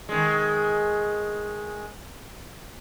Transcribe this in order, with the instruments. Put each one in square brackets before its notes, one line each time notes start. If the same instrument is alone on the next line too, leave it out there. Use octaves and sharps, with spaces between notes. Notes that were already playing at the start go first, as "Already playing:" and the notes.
[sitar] D#3 G#3